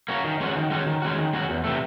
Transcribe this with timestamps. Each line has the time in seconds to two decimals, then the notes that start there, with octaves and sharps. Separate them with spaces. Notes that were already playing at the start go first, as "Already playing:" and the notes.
0.09 A#3 C#4 F#4
0.24 D#3
0.40 G#3 C#4 F#4
0.56 D#3
0.70 G#3 C#4 F#4
0.86 D#3
1.02 G#3 C#4 F#4
1.18 D#3
1.33 G#3 C#4 F#4
1.49 E2
1.64 C3 E3 A3